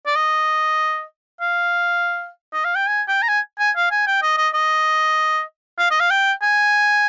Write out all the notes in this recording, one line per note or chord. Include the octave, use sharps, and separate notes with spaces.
D5
D#5
F5
D#5
F5
G5
G#5
G5
A#5
G#5
G#5
F5
G#5
G5
D#5
D#5
D#5
F5
D#5
F5
G5
G#5